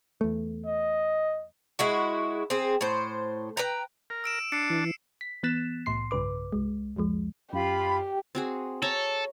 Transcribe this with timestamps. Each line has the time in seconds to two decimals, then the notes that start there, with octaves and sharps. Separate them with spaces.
0.21 E2 A3
0.66 D#5
1.79 G#3 E4 F#4
2.50 C4 G#4
2.81 A2 C5
3.57 B4 G5 A#5
4.10 A#4
4.24 E6 D7 E7
4.52 D4 C7 C#7
4.70 E3
5.21 B6
5.43 E3 B3 F#6 A6 B6 E7
5.86 C2 A2 C6 C7
6.11 B1 G2 C#3 B4 D6
6.52 C2 G#3
6.96 C2 F2 F3 G#3
7.53 F#2 F4 G4 B5
8.35 C4 F#4 G#4
8.82 A4 C#5 A#5 C#6